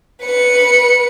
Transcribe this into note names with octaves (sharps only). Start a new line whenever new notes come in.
B4 C#7